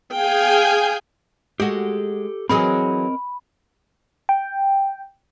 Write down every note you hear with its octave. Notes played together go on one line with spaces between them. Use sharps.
G#4 F5 G5 G#5 G6
G#3 F#4 G4 A4
E3 F#3 C4 G#4 A#4 D#5 B5
G5